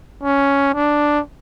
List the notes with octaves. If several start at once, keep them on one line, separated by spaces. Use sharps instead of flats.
C#4
D4